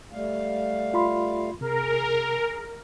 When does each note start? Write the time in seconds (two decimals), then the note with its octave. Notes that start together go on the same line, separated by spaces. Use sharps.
0.12 G3 A3 F5
0.94 F4 B5 C6
1.61 C3 G#4 A#4